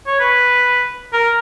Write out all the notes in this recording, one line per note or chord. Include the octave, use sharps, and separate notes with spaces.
C#5
B4
A#4